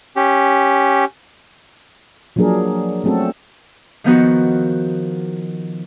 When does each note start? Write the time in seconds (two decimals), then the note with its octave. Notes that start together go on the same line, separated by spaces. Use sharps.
0.16 C#4 G4
2.36 F3 F#3 A#3 D4 G#4 A#4
3.04 F#3 A3 C4 C#4 F#4 A4
4.04 D#3 F3 B3 D#4 F#4